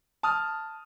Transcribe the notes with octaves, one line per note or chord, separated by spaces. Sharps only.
A5 D#6 F6